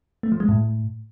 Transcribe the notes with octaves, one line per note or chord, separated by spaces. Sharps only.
A3
F3
G#3
A2